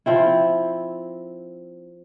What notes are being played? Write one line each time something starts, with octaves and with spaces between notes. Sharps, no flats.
F3 C4 E4